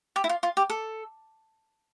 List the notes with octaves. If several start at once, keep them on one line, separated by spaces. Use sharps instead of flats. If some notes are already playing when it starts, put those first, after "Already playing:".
G4
E4
F4
F4
G4
A4